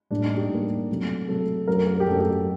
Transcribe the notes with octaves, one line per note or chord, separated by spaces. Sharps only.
A2 G3 A#3 D4
D#4
G4
A2 G3 A#3
C3 F#3 A3
C3 F#3 A3 A4
F#2 F#3 A3 A#4
A#4
G4
F#2 F#3 A3 A4
G4